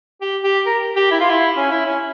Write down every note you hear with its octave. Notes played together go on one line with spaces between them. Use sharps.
G4
G4
A#4
G4
E4
F4
E4
C#4
E4
C#4